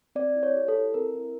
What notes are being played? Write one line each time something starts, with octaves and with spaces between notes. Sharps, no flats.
C4 D5
E4
C#5
G4
A4
E4
C4 A#4
E4